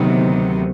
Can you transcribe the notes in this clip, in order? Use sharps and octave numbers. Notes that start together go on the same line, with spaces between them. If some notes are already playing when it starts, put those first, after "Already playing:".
Already playing: D2 C3 D#3 F#3 B3